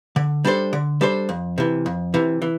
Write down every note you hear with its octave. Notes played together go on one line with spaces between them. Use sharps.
D3
G3 D4 A4 C5
D3
G3 D4 A4 C5
F2
C3 E3
F2
C3 E3
E3